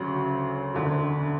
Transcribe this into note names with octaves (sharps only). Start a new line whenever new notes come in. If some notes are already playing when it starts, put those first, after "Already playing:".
Already playing: D2 C#3 F#3
E1 D2 D3